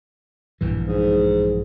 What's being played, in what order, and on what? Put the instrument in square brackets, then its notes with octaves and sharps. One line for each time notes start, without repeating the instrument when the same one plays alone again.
[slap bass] A#1 G2 E3
[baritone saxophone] G#2